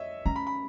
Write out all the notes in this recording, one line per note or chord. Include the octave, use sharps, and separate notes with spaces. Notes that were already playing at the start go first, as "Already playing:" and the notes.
Already playing: C#5 D#5 E5
C#4 A#5
B5
B5